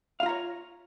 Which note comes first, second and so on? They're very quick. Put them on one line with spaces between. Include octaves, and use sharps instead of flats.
F5 F4 A#5 C#5